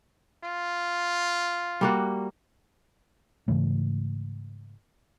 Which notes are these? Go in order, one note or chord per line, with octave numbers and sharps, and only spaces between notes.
F4
G3 A#3 F#4
G#2 C#3 E3 A3